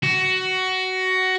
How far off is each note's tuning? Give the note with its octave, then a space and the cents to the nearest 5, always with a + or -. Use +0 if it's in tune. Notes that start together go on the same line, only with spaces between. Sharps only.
F#4 +15